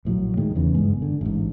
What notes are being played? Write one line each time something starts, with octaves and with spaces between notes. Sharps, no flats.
A#1 A2 C3 F#3
A2 D#3 G#3
E2 C#3 E3
F#1 G2 G#3 B3
D3
A1 G#2